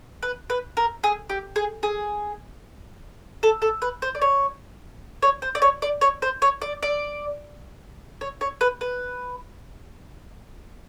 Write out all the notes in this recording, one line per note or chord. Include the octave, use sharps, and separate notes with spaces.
B4
B4
A#4
G#4
G4
G#4
G#4
A4
A4
B4
C5
D5
C#5
C#5
C5
D5
C#5
D5
C#5
C5
C#5
D5
D5
C#5
C#5
B4
B4